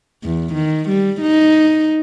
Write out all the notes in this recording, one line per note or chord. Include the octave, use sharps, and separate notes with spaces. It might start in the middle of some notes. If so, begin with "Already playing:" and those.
E2
D#3
G3
D#4